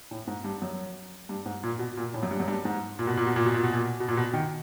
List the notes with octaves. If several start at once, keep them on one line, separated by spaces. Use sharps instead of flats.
A2
G#2
G2
F#2
G2
G#2
A#2
B2
A#2
A2
F#2
G2
F#2
G2
G#2
A#2
B2
A#2
B2
A#2
B2
A#2
B2
A#2
B2
A#2
B2
D#3